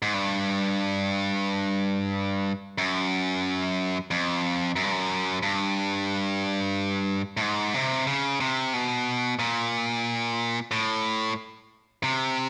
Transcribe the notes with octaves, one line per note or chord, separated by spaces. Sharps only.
G#2
G2
F#2
F2
F#2
G2
F#2
G2
A2
G#2
C3
C#3
C3
B2
A#2
A2
C3